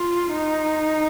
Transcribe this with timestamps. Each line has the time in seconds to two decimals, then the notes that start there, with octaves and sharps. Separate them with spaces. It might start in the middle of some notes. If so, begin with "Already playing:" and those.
Already playing: F4
0.32 D#4